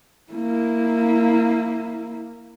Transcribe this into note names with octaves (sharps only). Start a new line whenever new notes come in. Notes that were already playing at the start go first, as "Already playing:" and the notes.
A#3 E4